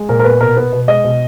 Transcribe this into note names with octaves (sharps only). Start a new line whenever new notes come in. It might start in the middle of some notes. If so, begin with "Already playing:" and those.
Already playing: G#3
A#2 A#4
A#4
B3 B4
B2 A#4
B3 B4
B2
G#3 D#5
B2